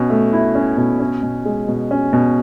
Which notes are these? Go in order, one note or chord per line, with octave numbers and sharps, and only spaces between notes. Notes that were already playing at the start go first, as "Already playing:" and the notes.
Already playing: B2 C#4
A3
E4
C#4
B2
C#4
B2
G#3
B2
C#4
B2